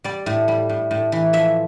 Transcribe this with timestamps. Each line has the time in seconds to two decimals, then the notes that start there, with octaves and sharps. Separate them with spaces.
0.04 G3 D5
0.26 A2
0.48 G3
0.69 A2
0.91 A2
1.12 E3
1.33 F3 E5